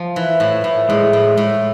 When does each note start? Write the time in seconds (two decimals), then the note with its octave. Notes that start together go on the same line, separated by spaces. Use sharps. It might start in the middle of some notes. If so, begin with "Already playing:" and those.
Already playing: F3
0.16 E3
0.40 A2
0.64 A2
0.89 A2 G#3
1.13 A2
1.37 A2